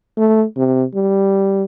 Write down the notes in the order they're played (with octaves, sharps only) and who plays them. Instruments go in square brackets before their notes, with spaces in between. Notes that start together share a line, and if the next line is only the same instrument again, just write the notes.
[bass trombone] A3
C3
G3